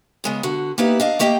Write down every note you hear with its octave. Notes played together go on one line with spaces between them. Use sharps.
C#3 G#3 B3
D3 F#4
A#3 B3 D#4 E4 G4 B4
D4 D#5 F5
A3 A#3 G4 D#5 E5 G5